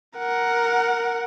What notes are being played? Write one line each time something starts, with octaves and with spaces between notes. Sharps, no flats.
A#4 F#5